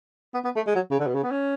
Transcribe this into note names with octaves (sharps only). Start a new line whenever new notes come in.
B3
B3
A3
G#3
F#3
C#3
D3
B2
C#3
B3
C#4